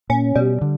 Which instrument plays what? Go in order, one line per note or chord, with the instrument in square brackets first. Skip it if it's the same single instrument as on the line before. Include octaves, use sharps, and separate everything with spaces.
[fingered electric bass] A#2 [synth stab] C#4
[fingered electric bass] B2 [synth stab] G3
[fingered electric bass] D3